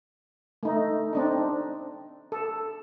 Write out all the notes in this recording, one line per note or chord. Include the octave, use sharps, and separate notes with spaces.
A3 D#4
C4 D4 D#4
A4